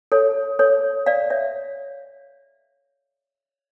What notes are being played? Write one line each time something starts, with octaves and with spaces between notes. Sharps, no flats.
A4 C#5
A4 C#5
D5 F5
C#5 E5